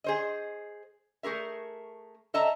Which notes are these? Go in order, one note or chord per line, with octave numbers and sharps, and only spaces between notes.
G#4 C5 D#5
A3 G#4 A#4 E5
A4 D#5 E5 A5 A#5